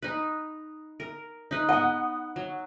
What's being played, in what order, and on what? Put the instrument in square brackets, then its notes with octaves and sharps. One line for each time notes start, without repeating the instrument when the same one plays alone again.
[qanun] D#4 B4
A#4
D#4 B4
[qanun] B3 D#5 [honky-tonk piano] F#5
[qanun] F#3